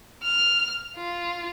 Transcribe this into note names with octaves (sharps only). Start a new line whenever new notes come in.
F6
F4